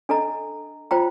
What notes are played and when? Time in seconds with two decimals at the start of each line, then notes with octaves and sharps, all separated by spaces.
0.09 D4 A4 D#5 A#5
0.91 F4 C5 G5 A#5